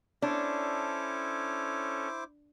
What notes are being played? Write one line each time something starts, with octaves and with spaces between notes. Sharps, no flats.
C#4 D4 E4 A4 C5 C#5 D6